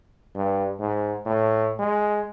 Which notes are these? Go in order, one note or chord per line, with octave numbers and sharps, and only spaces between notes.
G2
G#2
A2
G#3